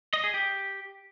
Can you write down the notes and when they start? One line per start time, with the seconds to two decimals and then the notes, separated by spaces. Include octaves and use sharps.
0.13 D#5
0.24 G#4
0.34 G4